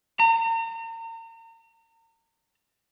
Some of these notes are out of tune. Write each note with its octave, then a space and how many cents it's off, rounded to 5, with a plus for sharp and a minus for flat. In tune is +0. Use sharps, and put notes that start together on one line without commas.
A#5 -40